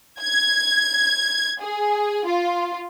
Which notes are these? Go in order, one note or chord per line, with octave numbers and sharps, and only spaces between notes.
G#6
G#4
F4